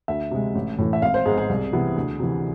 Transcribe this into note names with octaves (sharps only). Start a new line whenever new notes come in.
D2 E5
C3 G#3
A1
A2 E3
E5
G#1 F5
C5
G#2 G#3 B3 G#4
G#4
C2
C3 E3 B3 E4
D2
C3 E3